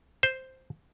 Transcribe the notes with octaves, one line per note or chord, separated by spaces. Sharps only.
C5